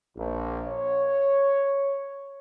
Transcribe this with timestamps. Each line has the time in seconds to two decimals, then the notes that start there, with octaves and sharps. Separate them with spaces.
0.17 A#1
0.69 C#5